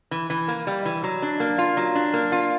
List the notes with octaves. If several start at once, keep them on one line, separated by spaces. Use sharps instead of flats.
E3
E3
A#3
G3
E3
F#3
D4
A#3
F4
F#3
D4
A#3
F4